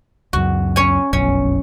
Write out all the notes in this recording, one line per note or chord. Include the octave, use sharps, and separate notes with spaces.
C#2 F#2 F#4
C#4 C#5 G#5
F1 B1 F#2 C#4